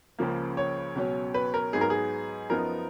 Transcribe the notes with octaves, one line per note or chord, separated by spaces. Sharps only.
C#2 C#3 F3 A#3
C#5
C#2 B2 F#3 C#4
B4
A#4
G#2 F#3 B3 D#4 G#4
A#4
G#4
F#2 F3 B3 D#4 A#4